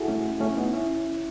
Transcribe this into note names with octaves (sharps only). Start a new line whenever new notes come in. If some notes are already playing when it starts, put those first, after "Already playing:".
Already playing: E4 F#4 G#4 A4
A3 C#4
A3 C#4
B3 D#4
C#4 E4